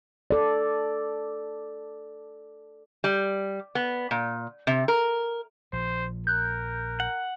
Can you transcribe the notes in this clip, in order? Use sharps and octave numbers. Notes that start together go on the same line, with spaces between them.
A4 D5
G3
B3
A#2
C3
A#4
A#1 F3 C5
A#4 F#6 G6
F#5